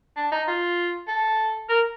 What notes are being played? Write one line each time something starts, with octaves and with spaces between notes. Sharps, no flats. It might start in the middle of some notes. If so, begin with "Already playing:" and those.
D4
D#4
F4
A4
A#4